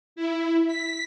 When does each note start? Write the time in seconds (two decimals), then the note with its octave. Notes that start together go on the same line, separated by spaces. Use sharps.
0.16 E4
0.68 B6